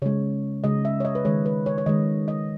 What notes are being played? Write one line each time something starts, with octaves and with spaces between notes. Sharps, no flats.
C#3 G#3 C#5
C#3 G#3 D#5
E5
C#5
D#5
B4
D#3 G#3 C#5
B4
C#5
C#5
D#3 G#3 D#5
D#5